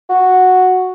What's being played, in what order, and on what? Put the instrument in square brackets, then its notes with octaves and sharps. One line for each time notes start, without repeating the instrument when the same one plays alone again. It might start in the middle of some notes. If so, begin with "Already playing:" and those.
[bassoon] F#4